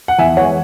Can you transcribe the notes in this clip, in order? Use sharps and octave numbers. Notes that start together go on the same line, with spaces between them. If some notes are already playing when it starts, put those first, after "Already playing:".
F#5
E2 E5 G#5
E3 G#3 C#5 F#5